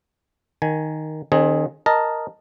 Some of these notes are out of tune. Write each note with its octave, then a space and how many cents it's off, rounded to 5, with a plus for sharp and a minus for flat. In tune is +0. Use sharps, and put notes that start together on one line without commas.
D#3 +0 G#5 +10
D#3 -30 C4 +30 G#4 +5
A#4 +0 D#5 +0 A5 +0